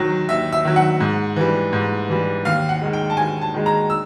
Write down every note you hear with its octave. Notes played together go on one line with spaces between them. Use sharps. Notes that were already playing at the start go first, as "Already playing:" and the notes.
Already playing: D#2 D#3 F#3
D#2 E5
E5
D#3 F#3
F#5
G#2
E3 G3
G#2
E3 G3
D#2 F5
F#5
D#3 G#3
G5
A5
D#2 G#5
A5
D#3 G#3
A#5
E6